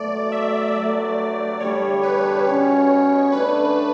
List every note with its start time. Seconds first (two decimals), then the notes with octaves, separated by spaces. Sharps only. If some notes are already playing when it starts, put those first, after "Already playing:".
Already playing: B2 F#3 A3 D5
0.32 E5
0.75 G2 F#3 A3 D5
1.60 E2 D3 G3 D4 G4 C#5
2.03 B4
2.47 B2 G3 C#4 C#5
3.32 D3 A3 D4 A4 B4